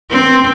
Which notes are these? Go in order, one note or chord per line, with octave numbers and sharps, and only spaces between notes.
C4